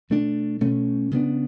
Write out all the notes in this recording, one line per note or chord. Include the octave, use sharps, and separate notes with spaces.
B2 A3 D4
B2 A3 C#4
C#3 G#3 B3 D4